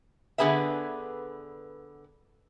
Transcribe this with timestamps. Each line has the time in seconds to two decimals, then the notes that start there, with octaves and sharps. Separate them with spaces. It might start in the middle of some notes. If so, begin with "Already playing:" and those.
0.38 D3 B3 G#4 B4 E5